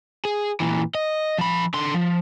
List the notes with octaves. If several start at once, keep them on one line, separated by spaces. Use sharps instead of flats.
G#4
A#2 E3
D#5
F3 B5
D3 C6
F3